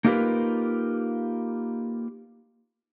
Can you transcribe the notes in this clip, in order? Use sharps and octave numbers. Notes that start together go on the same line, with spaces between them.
A#3 D#4 F4 G4 A#4 B4